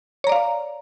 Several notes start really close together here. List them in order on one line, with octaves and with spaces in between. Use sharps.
C#5 A#5 D5 F5